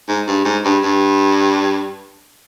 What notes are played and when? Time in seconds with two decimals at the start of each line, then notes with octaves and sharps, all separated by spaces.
0.08 G#2
0.27 G2
0.45 G#2
0.64 G2
0.83 G2